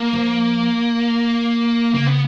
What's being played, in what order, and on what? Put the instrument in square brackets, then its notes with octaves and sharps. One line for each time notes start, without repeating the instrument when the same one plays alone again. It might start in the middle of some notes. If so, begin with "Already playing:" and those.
Already playing: [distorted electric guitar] A#3
[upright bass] F3
[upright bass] C#3 [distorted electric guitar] A#3
[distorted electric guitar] B3